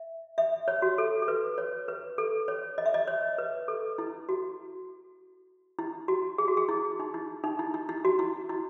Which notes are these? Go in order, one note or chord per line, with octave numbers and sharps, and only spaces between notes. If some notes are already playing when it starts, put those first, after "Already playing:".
Already playing: E5
E5
C#5
F#4
A4
A4
B4
C#5
B4
A4
C#5
D#5
E5
D#5
C#5
B4
A4
E4
F#4
E4
F#4
G#4
F#4
G#4
E4
D#4
E4
D#4
E4
E4
E4
F#4
E4
E4